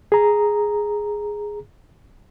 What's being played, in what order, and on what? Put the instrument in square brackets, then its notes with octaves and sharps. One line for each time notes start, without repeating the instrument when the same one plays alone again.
[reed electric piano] G#4 A#5